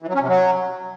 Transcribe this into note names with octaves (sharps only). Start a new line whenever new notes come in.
E3
F#3
C#4
C3
F#3